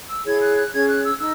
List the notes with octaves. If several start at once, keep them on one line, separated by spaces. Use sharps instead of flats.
E6
E4 G#4 C#5 G#6
F#6
F#6
C#4 G#4 C#5 G#6
F#6
E6
D#4 E6